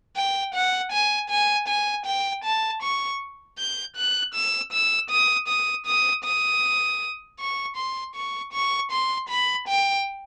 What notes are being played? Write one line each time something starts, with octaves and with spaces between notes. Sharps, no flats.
G5
F#5
G#5
G#5
G#5
G5
A5
C#6
G6
F#6
E6
E6
D#6
D#6
D#6
D#6
C#6
C6
C#6
C#6
C6
B5
G5